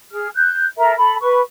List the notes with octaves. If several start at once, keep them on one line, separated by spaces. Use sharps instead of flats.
G#4 F6
F#6 G6
A4 A#4 E5 A#5
A4 B5
B4 C#6